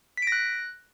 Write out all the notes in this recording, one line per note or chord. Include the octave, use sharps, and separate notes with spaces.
F#6 A#6 B6 D7